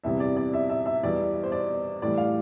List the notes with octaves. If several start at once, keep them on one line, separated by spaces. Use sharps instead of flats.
E2 C3 G3 E5
D5
D5
E5
E5
E5
E2 B2 G3 D5
C5
D5
A2 E3 G3 D5
F5